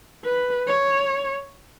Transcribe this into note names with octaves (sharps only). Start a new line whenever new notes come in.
B4
C#5